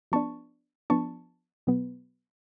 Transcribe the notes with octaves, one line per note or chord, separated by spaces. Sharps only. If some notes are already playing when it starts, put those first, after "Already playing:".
F3 B3 D4 A5 C#6
F3 B3 D4 A5 C#6
B2 F#3 B3